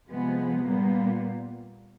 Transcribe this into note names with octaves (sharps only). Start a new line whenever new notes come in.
C3 F3 G#3 B3
A#2 G3 A#3 B3